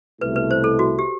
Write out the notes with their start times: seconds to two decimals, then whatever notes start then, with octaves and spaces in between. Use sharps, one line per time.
0.21 C2 B2 A3 E4 B4
0.36 B4
0.51 C5
0.64 A4
0.79 F#4
0.99 G4